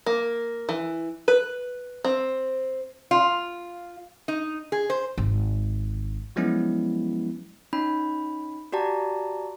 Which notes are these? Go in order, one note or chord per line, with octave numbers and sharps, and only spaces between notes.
A#3
E3
B4
C4
F4
D#4
G#4
C5
G#1
F3 F#3 G#3 B3 C#4 E4
C#4 D#4 B5
F#4 G4 D5 A5 A#5